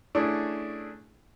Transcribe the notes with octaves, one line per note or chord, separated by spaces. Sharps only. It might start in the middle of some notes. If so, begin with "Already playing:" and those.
A3 C#4 D4 E4 G#4